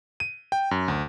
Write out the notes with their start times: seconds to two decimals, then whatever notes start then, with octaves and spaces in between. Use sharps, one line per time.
0.20 D#7
0.52 G5
0.71 F#2
0.88 D2